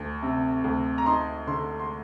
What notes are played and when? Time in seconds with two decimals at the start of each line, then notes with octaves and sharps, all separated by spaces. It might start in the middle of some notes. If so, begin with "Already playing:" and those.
Already playing: D2
0.23 C3
0.64 D2
0.98 A#5
1.06 D#4 C6
1.47 D3 C6
1.80 C6